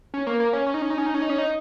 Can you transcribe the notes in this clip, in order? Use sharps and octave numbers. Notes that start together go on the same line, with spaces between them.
C#4
A#3
A#3
C#4
C#4
D#4
C#4
D#4
C#4
D#4
C#4
D#4
C#4
D#4